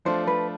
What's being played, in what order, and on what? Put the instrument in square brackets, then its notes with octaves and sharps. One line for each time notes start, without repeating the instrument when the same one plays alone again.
[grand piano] F3 A3 D4 F4 [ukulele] C5
[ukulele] B4